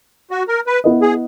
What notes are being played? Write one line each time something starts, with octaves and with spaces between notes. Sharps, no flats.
F#4
A#4
B4
B3 E4 B4 D#5
G#4